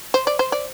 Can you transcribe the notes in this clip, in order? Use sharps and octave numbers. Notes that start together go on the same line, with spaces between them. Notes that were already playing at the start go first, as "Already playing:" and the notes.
C5
D5
C5
D5